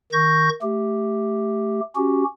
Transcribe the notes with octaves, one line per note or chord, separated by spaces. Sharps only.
D#3 C#6 G6 A#6
A3 G4
C#4 F#4 G4